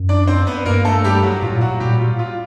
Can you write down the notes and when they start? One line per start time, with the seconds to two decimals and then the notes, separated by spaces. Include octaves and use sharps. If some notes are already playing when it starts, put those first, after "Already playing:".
Already playing: F#2
0.09 D4 D5
0.27 C4 C5
0.47 B3 B4
0.65 G2 A#3 A#4
0.85 A3 A4
1.04 G3 G4
1.23 F#3 F#4
1.42 A2 F4
1.54 A#2
1.61 A2 F#3 F#4
1.80 A#2 G3 G4
1.99 F4
2.19 F4